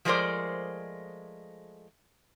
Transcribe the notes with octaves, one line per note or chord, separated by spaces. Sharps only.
F3 G#3 A3 A#4 C5 D5